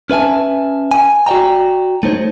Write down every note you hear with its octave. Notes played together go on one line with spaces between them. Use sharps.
C#4 B4 E5 G#5 A5
G#5
F#4 D5 D#5 G5 A#5
A3 D#4 C5 C#5